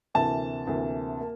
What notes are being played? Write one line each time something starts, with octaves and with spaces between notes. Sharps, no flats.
D2 C3 E3 A#3 A5
D2 C3 E3 A#3
A#3